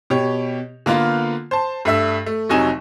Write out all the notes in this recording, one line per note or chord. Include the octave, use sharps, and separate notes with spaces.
B2 G4 C#5
D3 A#3 B3 F4
C5 A5
G2 A3 E5 E6
A3
F1 C3 F#3 D#4 G#5 E7